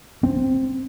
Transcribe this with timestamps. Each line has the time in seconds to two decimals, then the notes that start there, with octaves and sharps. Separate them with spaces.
0.23 C4